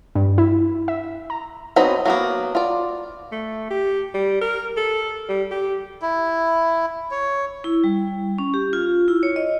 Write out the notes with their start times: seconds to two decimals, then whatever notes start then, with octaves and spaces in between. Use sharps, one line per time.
0.15 G2
0.38 E4
0.88 E5
1.30 A#5
1.76 F#3 B3 C4 D#4 B4
2.05 F#3 A#3 B3
2.55 F4 D5
3.32 A3
3.70 G4
4.14 G3
4.41 A#4
4.77 A4
5.29 G3
5.51 G4
6.02 E4
7.11 C#5
7.64 E4
7.84 G3
8.38 C#4
8.54 G4
8.73 F4
9.08 E4
9.23 C#5
9.36 D#5